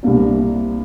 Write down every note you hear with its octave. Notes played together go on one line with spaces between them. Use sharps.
C2 C3 G3 A#3 D4